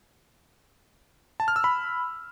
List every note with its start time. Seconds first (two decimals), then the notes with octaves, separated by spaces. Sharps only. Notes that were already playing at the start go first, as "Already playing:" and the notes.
1.40 A5
1.48 F6
1.56 E6
1.64 B5